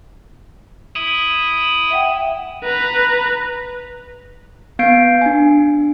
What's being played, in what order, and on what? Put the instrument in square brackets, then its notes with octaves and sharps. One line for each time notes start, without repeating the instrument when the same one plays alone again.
[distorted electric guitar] E4 [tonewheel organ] D#6
[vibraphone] E5 F#5 G5
[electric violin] B4 A#5
[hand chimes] B3 F5 G6 C7 D7
D4 G#5